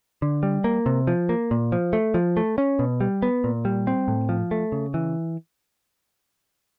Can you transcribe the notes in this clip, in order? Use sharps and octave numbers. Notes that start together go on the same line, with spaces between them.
D3
G3
A#3
C3
F3
A#3
A#2
F3
A3
F3
A3
C#4
B2
G3
B3
A#2
G3
C4
A2
F3
A3
C#3
E3